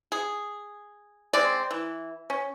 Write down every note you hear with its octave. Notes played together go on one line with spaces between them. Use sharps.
G#4
G#3 C4 D5
E3
C#4